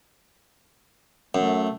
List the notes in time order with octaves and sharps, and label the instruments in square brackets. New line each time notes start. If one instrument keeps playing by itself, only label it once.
[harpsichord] F#2 [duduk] A3